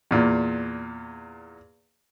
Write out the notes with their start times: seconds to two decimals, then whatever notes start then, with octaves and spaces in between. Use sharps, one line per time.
0.11 E2 A#2